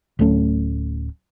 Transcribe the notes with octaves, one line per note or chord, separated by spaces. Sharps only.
D1 F#3 A3 C#4